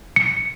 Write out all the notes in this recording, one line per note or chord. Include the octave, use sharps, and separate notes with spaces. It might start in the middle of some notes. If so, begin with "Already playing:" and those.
C#7